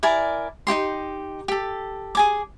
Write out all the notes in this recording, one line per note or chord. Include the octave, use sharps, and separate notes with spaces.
E4 A#4 D5 G#5
D#4 E4 G4 C6
G4 A4
G#4 G#5 D6